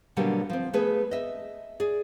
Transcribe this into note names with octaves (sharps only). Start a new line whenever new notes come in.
B2 D3 F#3 G3 A#3 G4
F3 C4
A3 B3 G#4 B4
D#5 E5
G#4 D5